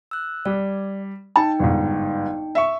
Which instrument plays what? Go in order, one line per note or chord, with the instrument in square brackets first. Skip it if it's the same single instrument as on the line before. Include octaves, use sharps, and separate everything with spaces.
[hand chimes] E6 F#6
[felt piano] G3 [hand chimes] D5
[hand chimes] D#4 G5 [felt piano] A5
[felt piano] G1 G#2
E5 C#6